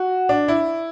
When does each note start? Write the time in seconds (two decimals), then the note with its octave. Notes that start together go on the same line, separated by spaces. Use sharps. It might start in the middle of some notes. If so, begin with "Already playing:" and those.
Already playing: F#4
0.29 D4
0.48 E4